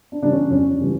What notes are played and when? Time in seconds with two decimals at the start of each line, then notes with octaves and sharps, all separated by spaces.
0.12 D4
0.22 C#3 E3 G3 D4
0.31 C#4
0.50 F2 C#4
0.80 C#3 E3 G3